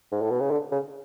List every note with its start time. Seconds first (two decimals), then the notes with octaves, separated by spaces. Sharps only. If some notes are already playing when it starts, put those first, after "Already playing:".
0.11 G#2
0.22 A2
0.30 B2
0.40 C#3
0.50 D3
0.72 C#3